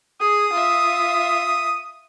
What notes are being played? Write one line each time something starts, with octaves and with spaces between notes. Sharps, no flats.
G#4 D#6
F4 E5